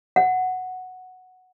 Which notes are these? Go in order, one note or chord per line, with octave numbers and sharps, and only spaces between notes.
F#5